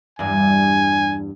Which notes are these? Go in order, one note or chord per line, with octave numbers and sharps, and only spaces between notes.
E2 G2 G#5